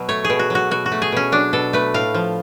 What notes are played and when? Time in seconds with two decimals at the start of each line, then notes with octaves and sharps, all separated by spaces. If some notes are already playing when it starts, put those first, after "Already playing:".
Already playing: B2 F#3
0.09 A3 C#5
0.24 G#4
0.30 B2
0.39 F#4
0.50 F#3 F#4
0.71 B2 F#4
0.86 F#4
0.92 A3
1.02 G#4
1.12 B2 C#4
1.32 F#3 D4
1.53 B2 A4
1.73 A3 B4
1.94 A2 F5
2.14 F3